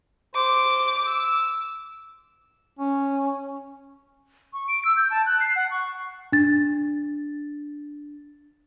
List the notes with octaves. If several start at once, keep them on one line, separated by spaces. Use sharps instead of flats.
C5 D6
E6
C#4
C#6
D7
E6
G6
A5
F#6
C7
F#5
C#6
D4 A6